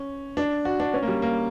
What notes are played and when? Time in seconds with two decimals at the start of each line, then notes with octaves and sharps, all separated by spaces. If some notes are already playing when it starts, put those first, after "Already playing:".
Already playing: C#4
0.37 D4
0.65 F#4
0.80 D4
0.94 C#4
1.02 A#3
1.08 G3
1.22 A#3